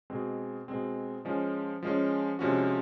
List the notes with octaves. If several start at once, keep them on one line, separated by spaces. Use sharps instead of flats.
B2 G#3 C4
B2 G#3 C4
F3 G#3 C#4
F3 G#3 C#4
C3 F3 G#3 C#4 F#4